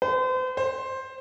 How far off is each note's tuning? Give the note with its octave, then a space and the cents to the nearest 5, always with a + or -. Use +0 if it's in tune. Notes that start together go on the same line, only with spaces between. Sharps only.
C5 -40
C5 +10